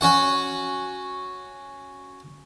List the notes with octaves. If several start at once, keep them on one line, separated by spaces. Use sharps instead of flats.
C#4 F#4 F#5